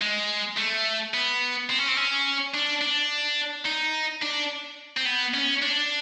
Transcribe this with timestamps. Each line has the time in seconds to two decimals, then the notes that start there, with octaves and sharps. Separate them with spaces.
0.01 G#3
0.58 A3
1.14 B3
1.70 C4
1.79 C#4
1.88 C4
1.97 C#4
2.54 D4
2.82 D4
3.66 D#4
4.22 D4
4.97 C4
5.06 B3
5.34 C#4
5.62 D4